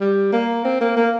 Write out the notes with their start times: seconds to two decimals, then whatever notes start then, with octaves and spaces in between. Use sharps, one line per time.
0.01 G3
0.33 A#3
0.65 C4
0.81 A#3
0.97 A#3